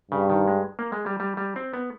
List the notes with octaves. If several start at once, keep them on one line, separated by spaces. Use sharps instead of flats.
G2 C#3
D#3
G#3
A#3
G#3
G3
G3
G3
C4
B3